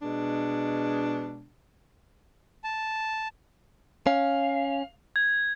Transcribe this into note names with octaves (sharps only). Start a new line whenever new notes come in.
B2 G#3 D4
A5
C#4 F5
G#6